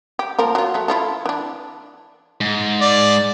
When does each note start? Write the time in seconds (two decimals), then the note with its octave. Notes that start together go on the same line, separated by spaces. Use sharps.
0.19 G4
0.39 F3 A#3 A#4
0.55 F#3 F4
0.74 F#3 A3
0.88 E4 F4 A4
1.26 E3 D4
2.41 G#2
2.81 D5